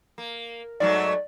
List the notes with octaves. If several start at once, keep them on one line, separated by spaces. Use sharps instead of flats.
A#3
G#2 F#3 A3 D5